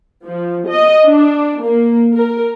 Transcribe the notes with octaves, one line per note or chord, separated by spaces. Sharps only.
F3
D#5
D4
A#3
A#4